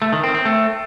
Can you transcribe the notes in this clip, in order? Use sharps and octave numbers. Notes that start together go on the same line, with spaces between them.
A3
D#3
C4
C4
A3